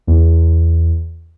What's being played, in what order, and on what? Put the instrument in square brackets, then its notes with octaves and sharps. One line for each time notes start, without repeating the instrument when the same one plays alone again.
[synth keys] E2